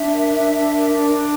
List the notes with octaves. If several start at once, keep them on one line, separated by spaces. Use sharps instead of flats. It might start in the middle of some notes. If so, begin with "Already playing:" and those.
Already playing: D4 E5
A#4
D4
D4
A#4
D4
D4